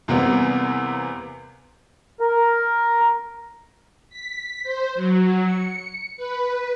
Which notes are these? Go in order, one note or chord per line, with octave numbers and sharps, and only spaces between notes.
E2 C3 G3 A#3 B3
A#4
B6
C5
F#3
C#7
B4